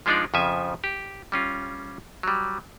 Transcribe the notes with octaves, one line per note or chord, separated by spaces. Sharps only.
F3 G#3 D4 D#4 F4 D5
F2 C#3 F3 E5 G#5
G4
G3 C#4 F4
F#3 G3